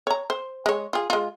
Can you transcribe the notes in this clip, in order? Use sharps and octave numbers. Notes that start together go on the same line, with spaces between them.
C#5 A#5
C5
G#3 C#5
F4 G#4
G#3 F4